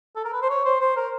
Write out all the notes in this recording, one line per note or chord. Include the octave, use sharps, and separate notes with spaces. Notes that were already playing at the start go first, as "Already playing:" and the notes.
A4
A#4
B4
C5
C#5
C5
C5
A#4